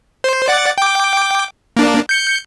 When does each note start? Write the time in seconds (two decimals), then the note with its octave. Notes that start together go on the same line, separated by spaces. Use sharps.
0.24 C5
0.48 D5 F#5 A6
0.78 G5 D6
1.77 A#3 D4
2.09 G6 C#7